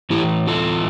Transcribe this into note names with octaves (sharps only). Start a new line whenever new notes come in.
A2 E3 A3 E4 G4
F4 A4